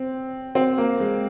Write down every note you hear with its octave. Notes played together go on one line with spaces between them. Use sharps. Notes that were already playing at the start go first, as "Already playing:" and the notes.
Already playing: C4
C4
A#3
G#3